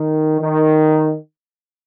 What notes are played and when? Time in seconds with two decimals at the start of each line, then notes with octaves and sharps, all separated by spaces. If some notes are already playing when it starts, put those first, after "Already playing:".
Already playing: D#3
0.41 D#3